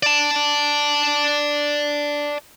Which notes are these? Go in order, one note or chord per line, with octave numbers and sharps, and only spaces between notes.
D5 A5